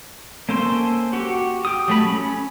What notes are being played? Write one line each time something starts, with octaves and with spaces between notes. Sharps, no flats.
A#3 C#4 A4 C5 C6
F#4 G4
G4 D#6
F#3 A3 B5
C#4